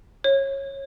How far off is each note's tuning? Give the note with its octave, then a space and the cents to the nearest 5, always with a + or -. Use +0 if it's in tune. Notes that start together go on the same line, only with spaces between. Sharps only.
C#5 -20